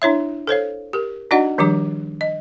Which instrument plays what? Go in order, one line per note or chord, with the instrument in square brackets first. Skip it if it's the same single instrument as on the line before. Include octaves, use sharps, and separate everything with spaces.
[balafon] D4 E4 C#5 E5
A4 C5 C#5 F5
G4 A#4
D4 D#4 F#4 D5 D#5 F#5
D#3 F3 G3 D4 G4 D6
D#5